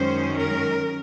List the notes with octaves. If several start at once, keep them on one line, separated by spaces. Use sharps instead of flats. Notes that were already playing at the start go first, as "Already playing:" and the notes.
Already playing: F#2 D#3 G#3 C#4 C5
A#4